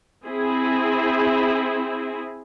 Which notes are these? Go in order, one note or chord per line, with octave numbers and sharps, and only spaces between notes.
C4 E4 G#4